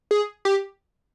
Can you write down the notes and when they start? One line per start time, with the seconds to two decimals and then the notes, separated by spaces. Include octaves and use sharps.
0.11 G#4
0.45 G4